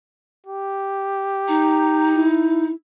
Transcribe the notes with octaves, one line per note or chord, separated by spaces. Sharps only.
G4
D#4 A#5
E4